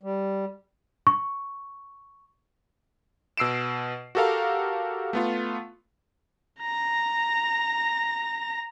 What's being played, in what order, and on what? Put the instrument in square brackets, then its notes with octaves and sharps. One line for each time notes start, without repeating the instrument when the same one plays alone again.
[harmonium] G3
[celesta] C#6
[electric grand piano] B2 E6 C7 D7 E7
F#4 G4 A4 A#4 F5 A#5
A3 B3 F4
[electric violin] A#5 A#6